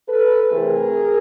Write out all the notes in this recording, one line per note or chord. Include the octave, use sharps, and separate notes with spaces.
A4 B4
C3 E3 A3 C4 G#4 A#4